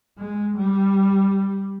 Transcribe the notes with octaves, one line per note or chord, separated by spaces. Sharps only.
G#3
G3